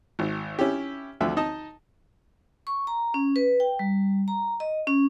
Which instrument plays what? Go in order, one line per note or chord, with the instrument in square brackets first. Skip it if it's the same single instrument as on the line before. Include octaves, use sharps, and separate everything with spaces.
[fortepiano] G#1
C#4 E4 G4
D2 D3 F3 E5
D#4 D#5 A5
[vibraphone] C#6
A#5
C#4
B4
G5
G3
A#5
D#5
C#4